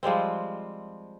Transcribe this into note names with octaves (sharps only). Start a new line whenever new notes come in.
F3 G3 G#3 C4